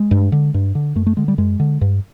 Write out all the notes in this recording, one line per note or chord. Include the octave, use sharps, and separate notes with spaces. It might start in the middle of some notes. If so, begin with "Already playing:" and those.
Already playing: G#3
G2
D3
G2
D3
F#2 A3
A3
D3 G#3
G3
F#2 G#3
D3
G2